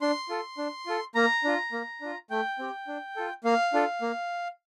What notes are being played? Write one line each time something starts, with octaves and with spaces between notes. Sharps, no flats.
D4 C6
F4 A4
D4
F4 A4
A#3 A#5
D4 F4
A#3
D4 F4
A3 G5
C4 G4
D4
F4 A4
A#3 F5
D4 F4 A4
A#3